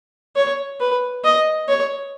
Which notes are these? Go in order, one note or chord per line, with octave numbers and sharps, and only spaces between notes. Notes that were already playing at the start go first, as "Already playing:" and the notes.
C#5
B4
D#5
C#5